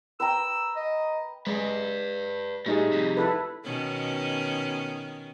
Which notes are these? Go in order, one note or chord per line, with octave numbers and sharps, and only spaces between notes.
B4 G5 A#5 E6
D#5
G#3 B4 D5
A2 G3 D#4 G#4
F2 C3
E4 A4 B4
B2 D#3 C#4